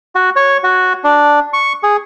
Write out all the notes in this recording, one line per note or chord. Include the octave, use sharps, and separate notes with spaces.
F#4
C#5
F#4
D4
C#6
G#4